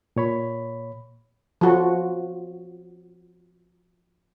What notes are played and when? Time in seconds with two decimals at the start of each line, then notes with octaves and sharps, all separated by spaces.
0.16 A#2 C#5 B5
1.61 F3 F#4